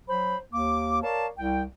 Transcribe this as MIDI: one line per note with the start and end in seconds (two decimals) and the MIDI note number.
0.08 0.37 54
0.08 0.37 72
0.08 0.37 83
0.53 1.02 39
0.53 1.02 58
0.53 1.02 86
1.02 1.26 70
1.02 1.26 73
1.02 1.26 74
1.02 1.26 77
1.02 1.26 81
1.38 1.63 36
1.38 1.63 79